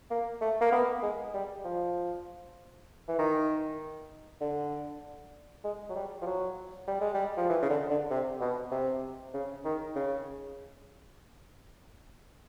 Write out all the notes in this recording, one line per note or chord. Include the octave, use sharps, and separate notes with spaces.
A#3
A3
A#3
B3
G#3
G3
F3
E3
D#3
D3
G#3
F#3
G3
F3
F#3
G3
G#3
G3
F3
E3
C#3
D3
D3
C3
B2
C3
C#3
D#3
C#3